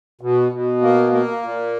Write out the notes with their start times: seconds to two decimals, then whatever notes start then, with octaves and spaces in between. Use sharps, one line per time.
0.21 B2
0.52 B2
0.81 A#3
1.12 A#3
1.42 A#2